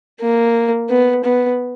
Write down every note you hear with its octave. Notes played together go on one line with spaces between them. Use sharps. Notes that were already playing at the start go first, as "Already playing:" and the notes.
A#3
B3
B3